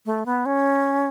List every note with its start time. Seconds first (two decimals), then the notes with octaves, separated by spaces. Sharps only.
0.06 A3
0.26 B3
0.46 C#4